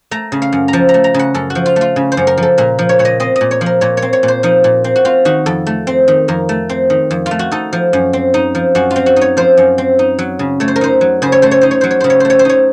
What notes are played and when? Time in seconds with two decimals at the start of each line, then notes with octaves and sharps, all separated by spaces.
0.11 A3 A#5
0.32 C#3
0.42 F5
0.53 F#2
0.68 A#5
0.73 F3 A5
0.89 A#5
0.94 A3
1.04 A#5
1.14 C#3 F#5
1.34 F#2 A4
1.50 F#4
1.55 F3
1.66 F4
1.76 A3 F4
1.96 C#3
2.12 C5
2.17 F#2
2.27 A#4
2.37 F3
2.43 A4
2.58 A#2 A#4
2.79 F3
2.89 C#5
2.99 A#2 C#5
3.05 D#5
3.20 C4 D#5
3.36 D#5
3.41 A#2
3.51 C#5
3.61 F3
3.66 A#4
3.81 A#2 C#5
3.97 C#5
4.02 C4
4.13 C#5
4.23 A#2
4.28 C5
4.43 F3 D#4
4.64 A#2
4.84 C4
4.96 F#4
5.05 C4 F4
5.25 D#3 F#4
5.46 F2 A4
5.67 A3
5.87 C4
6.08 D#3
6.28 F2 A#4
6.49 A3
6.69 C4
6.90 D#3
7.11 F2
7.26 F4
7.31 A3
7.39 F#4
7.51 D#4 A4
7.73 F3
7.93 F#2
8.13 C4
8.34 D#4
8.55 F3
8.75 F#2 F#4
8.91 F4
8.96 C4
9.06 F#4
9.16 D#4
9.21 C#5
9.37 F3 C5
9.57 F#2
9.78 C4
9.99 D#4
10.19 F#3
10.39 C#3
10.60 A3 C#5
10.68 C5
10.76 A#4
10.81 D#4 C5
11.01 F#3
11.22 C#3 C5
11.32 C#5
11.42 A3 C5
11.51 C#5
11.61 D#4 C5
11.71 C#5
11.81 F#3 C5
11.91 C#5
12.00 C#3 C5
12.10 C#5
12.20 A3 C5
12.30 C#5
12.39 C5
12.45 D#4 C#5